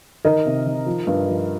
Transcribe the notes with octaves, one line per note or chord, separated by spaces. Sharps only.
D#3 A#4 D#5
C3
D#3
F3
G2
F3